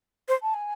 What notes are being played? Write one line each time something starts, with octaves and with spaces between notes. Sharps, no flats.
C5
A5
G#5